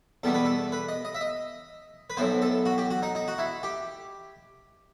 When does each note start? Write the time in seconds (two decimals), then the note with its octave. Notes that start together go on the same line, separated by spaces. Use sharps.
0.23 E2 B2 G3 B3 A4
0.34 B4
0.45 A4
0.72 B4
0.89 D#5
1.05 D#5
1.15 E5
1.21 D#5
2.10 B4
2.17 B1 A2 E3 B3 C5
2.42 A4
2.65 F#4
2.78 G4
2.90 F#4
3.03 D#4
3.15 D#4
3.28 F#4
3.38 E4
3.63 G4